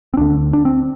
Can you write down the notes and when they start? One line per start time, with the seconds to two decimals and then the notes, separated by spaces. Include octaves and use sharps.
0.14 C4
0.17 D2 D3 D4
0.53 D4
0.65 C4